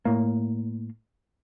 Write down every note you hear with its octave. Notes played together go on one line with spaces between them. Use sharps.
A2 A#3